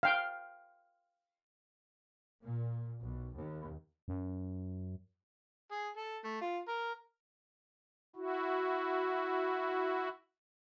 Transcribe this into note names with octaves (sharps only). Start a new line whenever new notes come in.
F5 G5
A#2
B1
D#2
F#2
G#4
A4
A3
F4
A#4
E4 F#4